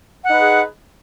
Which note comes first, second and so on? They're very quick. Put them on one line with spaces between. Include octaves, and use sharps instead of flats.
F#5 D#4 B4 G#4